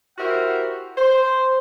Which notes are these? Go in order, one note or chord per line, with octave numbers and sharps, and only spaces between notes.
E4 F#4 G4 A#4 C5 F#5
C5